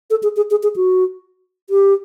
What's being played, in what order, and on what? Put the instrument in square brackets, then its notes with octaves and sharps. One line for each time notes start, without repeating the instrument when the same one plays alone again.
[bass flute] A4
G#4
G#4
G#4
G#4
F#4
G4